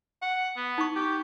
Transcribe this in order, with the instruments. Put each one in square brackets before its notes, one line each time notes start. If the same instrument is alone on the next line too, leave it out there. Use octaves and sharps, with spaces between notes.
[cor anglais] F#5
B3
[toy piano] D#4 C#6
[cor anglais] G4